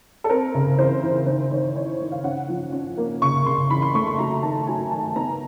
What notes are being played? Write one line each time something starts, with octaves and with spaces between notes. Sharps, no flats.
A4
C4 A#4
C#3
E3 C5
E3
D#3 C5
D#3 C#5
D#3 C#5
D#3
F5
C#4 F#5
F3
C#4
A#3
C#3 C#6
C#3 C6
E3 B5
C6
A3 C#6
C6
F#3 A#5
D#3 A5
F#3 G#5
D#3 A5
B3 A#5